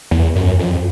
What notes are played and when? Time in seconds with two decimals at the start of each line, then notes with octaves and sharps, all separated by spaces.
0.11 E2
0.36 F#2
0.59 F2